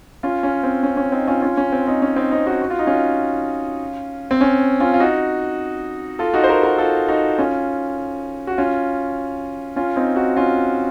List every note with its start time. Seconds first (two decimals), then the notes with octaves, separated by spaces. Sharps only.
0.23 C#4 F4
0.43 C#4
0.63 C4
0.83 C#4
0.97 C#4
1.12 C4 D#4
1.27 C#4 F4
1.42 C#4 F4
1.57 C#4
1.72 C4
1.87 C4 D#4
2.02 C#4
2.16 C4 D#4
2.31 C4 D#4
2.46 D#4 F#4
2.62 F#4
2.70 F4
2.79 D#4
2.87 C#4 F4
4.31 C4
4.41 C#4
4.80 C#4 F4
4.94 F4
5.00 D#4 F#4
6.19 F4 A4
6.33 D#4 F#4
6.44 C5
6.49 F#4 A#4
6.63 F#4 A#4
6.78 F4 A4
7.08 D#4 F#4
7.39 C#4 F4
8.47 F#4
8.58 C#4 F4
9.76 C#4 F4
9.96 C4 D#4
10.16 D#4 F#4
10.37 C#4 F4